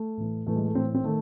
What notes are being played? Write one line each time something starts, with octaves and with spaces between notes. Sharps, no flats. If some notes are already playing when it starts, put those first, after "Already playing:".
Already playing: A3
A2 E3
A2 E3 A3
G#3
A3
A2 E3 C4
C4
D#3 A3